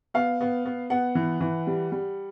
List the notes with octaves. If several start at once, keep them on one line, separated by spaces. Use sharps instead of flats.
B3 F5
B3
B3
B3 F#5
E3
E3
G3
G3